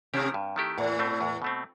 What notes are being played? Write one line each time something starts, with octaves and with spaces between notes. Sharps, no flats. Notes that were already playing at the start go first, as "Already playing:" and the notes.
C3 D#3 A3 E4 G4
G2
D#3 A3 E4 G4
E2 A2
B2 A3 C4
E2
B2 A3 C4